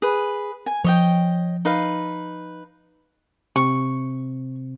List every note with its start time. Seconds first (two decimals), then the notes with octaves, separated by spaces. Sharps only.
0.02 G#4 B4
0.66 G#5
0.84 F3 C#5 D#5 G5
1.65 D#4 B4 F5
3.56 C3 C4 C#6